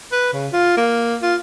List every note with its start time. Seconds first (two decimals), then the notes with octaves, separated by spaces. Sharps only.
0.12 B4
0.33 C#3
0.53 F4
0.77 A#3
1.23 F4